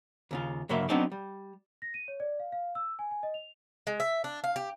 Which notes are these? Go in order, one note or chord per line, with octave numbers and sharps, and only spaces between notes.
D#2 C#3 F4
G2 C#3 F#3 A#3 E5
F#3 B3 C4 D4 D#4 D5
G3
A#6
D#7
C#5
D5
F5
F5
E6
G#5
G#5
D#5
F7
G#3
E5
D4
F5
G4